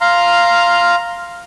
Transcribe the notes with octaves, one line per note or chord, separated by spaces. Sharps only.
F5 A#5 C6 F6